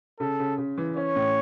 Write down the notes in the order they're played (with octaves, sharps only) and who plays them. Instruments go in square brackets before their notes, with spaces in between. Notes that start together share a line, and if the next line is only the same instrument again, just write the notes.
[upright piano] C#3 [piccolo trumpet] A4
[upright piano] C#3
C#3
E3
[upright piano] C#4 [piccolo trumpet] C#5
[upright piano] A2